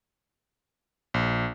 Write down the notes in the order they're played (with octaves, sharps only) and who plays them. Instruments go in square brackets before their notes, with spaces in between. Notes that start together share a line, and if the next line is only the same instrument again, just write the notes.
[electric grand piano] A#1